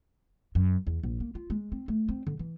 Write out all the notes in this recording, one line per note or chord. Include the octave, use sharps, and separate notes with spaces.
F#2
E2
A#1
A#3
F4
G#3
C4
A3
C4
D3
E3